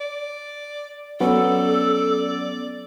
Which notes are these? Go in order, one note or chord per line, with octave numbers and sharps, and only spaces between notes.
D5
F#3 B3 C#4 A4 D5